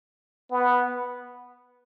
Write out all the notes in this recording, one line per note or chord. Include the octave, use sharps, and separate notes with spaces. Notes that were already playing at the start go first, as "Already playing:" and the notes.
B3